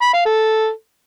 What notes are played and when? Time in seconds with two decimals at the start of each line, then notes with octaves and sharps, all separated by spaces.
0.02 B5
0.14 F5
0.26 A4